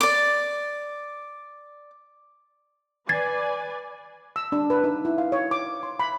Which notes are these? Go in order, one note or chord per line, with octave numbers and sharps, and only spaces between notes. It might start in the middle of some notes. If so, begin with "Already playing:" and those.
D5 D6
B4 D5 G#5 G#6 A6 C7
E6
D4
B4
D#4
E4
F5
C#5
D6
C6
B5